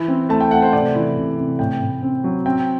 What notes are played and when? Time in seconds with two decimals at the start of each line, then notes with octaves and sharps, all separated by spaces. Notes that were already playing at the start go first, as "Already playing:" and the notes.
Already playing: E3
0.08 C4
0.29 A3 A5
0.41 G5
0.51 A3 F#5
0.62 C5
0.73 C3 D5
0.95 E3
1.16 C3
1.38 C3
1.59 A2 G5
1.81 A2
2.02 C4
2.24 F#3
2.46 C4 G5